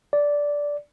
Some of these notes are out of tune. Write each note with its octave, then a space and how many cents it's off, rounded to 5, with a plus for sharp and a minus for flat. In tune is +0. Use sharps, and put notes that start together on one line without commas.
D5 -10